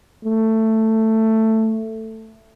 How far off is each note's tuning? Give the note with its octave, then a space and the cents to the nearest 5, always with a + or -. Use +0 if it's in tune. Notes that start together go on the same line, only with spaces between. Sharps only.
A3 +10